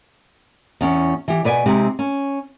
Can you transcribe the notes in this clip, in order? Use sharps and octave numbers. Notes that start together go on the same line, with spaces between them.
E2 C#4
E3 G4
B2 B4 D5 G#5
C3 G#3 C4 D#4 G4
C#4